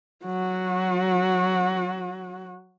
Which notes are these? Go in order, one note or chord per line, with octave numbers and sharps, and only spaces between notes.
F#3 F#4